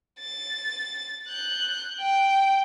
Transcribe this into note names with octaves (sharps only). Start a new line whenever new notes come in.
A6
F#6 G6
G5